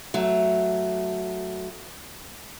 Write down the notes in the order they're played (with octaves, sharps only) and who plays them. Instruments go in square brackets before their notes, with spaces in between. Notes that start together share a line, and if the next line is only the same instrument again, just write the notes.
[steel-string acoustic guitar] F#3 A3